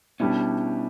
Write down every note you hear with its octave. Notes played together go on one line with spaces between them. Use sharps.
B2 G3 C#4 D4 E4 G4